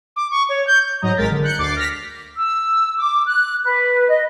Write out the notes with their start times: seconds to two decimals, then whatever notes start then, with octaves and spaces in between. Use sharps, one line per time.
0.16 D6
0.31 C#6
0.49 C#5
0.67 G6
1.01 G#2 F#3 D#5 A#5
1.17 G#1 G#3 A#4 A6 B6
1.30 D3
1.43 F#6 G6 C#7
1.58 D2 D6 A6 C7
1.75 F6 A#6 B6
2.37 E6
2.97 D6
3.26 F#6
3.63 B4
4.09 D#5